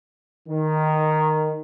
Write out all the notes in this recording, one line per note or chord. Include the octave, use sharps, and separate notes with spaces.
D#3